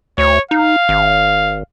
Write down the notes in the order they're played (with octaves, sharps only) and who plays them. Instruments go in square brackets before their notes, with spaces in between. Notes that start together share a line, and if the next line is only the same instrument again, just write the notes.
[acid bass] D2 [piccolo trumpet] C#5
[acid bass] D#4 [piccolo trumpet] F5
[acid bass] G#1